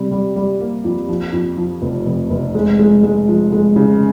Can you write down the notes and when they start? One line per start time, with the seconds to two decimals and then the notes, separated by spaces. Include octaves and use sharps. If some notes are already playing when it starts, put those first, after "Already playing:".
Already playing: C3 G3
0.11 G3
0.36 G3
0.60 A#3
0.84 F2
1.09 F3
1.32 F2
1.57 F3
1.82 F1
2.06 F1
2.30 F1
2.55 G#3
2.79 G#3
3.03 G#3
3.28 F3
3.52 G#3
3.76 C#3